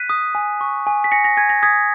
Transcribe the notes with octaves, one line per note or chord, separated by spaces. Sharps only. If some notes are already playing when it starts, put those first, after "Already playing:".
Already playing: F#6 B6 D#7
D#6
G#5
C#6
G#5
B6
G#5 A#6 C#7
A#6
G#5 G#6
A#6
D#6 G#6 B6